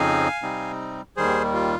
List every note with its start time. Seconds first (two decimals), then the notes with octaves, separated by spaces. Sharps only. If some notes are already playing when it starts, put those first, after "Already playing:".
Already playing: F2 C#3 F3 C4 D#4 F5 G#5
0.43 C3 G3 C4 D#4
1.17 D#2 D#3 G3 G#4 C5
1.54 F4